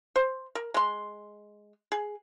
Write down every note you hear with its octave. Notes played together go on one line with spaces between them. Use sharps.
C5
A#4
G#3 C6
G#4